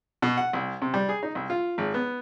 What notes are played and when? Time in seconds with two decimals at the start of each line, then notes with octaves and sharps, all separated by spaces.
0.22 B2
0.37 F#5
0.53 C2
0.82 C3
0.94 G3
1.09 G#4
1.23 D#4
1.35 C2
1.50 F4
1.78 G#1
1.94 B3